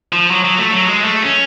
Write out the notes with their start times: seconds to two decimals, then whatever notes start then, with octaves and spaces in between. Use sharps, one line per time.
0.13 F3
0.31 F#3
0.45 F#3
0.58 A3
0.72 F#3
0.86 G#3
1.04 A3
1.22 C#4